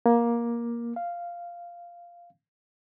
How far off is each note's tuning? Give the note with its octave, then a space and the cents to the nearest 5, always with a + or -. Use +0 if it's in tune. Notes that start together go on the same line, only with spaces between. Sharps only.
A#3 +15
F5 -5